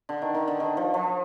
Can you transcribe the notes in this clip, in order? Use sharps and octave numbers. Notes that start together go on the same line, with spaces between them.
D3
D#3
D#3
D3
D#3
F3
F3